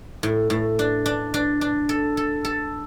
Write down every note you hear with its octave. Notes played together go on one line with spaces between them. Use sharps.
A2
A2
D4
D4
D4
D4
A4
A4
A4